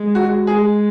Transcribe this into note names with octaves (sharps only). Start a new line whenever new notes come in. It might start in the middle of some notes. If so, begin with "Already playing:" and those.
Already playing: G#3
F#4
G#3 G#4